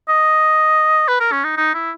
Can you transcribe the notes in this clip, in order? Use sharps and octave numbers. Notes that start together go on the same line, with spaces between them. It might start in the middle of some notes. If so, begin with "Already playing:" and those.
D#5
B4
A#4
C#4
D#4
D#4
E4